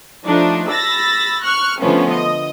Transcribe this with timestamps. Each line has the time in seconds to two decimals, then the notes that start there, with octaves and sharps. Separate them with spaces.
0.25 F3 A3 D4 D#4
0.69 B5 E6 A6 A#6
1.42 C#6 F6 F#6
1.80 D3 F3 A3 B3 C#4
2.11 D#5